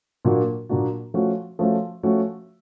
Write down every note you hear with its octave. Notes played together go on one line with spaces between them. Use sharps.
A#2 F#3 A#3 D4 F#4
A#2 F#3 A#3 D4 F#4
F3 A3 C#4 F#4
F3 A3 C#4 F#4
F3 A3 C#4 F#4